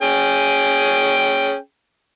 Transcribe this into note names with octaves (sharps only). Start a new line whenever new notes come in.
C#4 G#4 G5